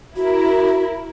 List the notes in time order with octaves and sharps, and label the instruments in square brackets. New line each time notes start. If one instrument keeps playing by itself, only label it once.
[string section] E4 A#4 [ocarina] F#4